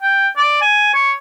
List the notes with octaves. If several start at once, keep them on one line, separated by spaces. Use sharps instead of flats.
G5
D5
G#5
C#5